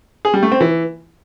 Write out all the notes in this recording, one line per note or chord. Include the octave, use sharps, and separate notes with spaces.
G#4
G3
A3
C4
E3